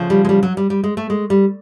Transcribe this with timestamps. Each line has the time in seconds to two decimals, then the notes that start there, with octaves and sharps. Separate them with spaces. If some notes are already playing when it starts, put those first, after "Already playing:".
Already playing: D2 C#3 F3
0.10 G3
0.25 G#3
0.29 G3
0.43 F#3
0.57 G3
0.70 G3
0.84 G#3
0.97 A3
1.10 G#3
1.30 G3